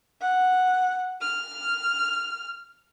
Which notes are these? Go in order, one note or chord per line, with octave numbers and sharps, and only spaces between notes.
F#5
F6